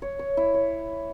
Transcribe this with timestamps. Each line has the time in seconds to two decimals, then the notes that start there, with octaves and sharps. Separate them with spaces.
0.02 C#5
0.19 C#5
0.37 E4
0.54 C#5